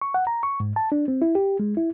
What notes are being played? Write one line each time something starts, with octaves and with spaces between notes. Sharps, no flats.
C#6
F#5
A#5
C#6
G#2
A5
D4
C4
E4
G4
G#3
E4